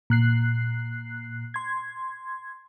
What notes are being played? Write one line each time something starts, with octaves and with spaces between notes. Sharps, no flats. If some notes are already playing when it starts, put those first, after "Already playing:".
A#2 F#6 C7
C6 G#6